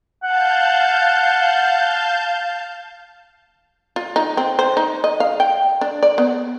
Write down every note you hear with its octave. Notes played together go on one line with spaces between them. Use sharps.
F5 F#5 A5 G6
F4
D#4
C4
C5
D#4
D#5
F5
G5
D4
D5
B3